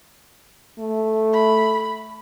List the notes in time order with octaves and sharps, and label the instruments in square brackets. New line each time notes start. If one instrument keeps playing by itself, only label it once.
[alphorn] A3
[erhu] B5